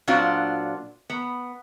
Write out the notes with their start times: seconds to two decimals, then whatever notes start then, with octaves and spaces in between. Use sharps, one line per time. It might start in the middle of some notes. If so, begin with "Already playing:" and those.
0.08 A#2 F#3 C4 D4 F4 F#4
1.10 B3